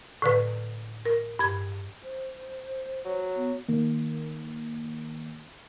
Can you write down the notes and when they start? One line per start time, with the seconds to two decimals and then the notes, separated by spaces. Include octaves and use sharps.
0.22 A2 D3 B4
1.06 A#4
1.39 G2 G#6
2.04 C5
3.05 F#3
3.36 B3
3.69 D#3 A#3